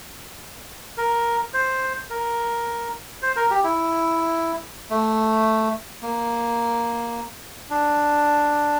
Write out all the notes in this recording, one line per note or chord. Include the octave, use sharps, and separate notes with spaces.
A#4
C5
A#4
C5
A#4
G4
E4
A3
A#3
D4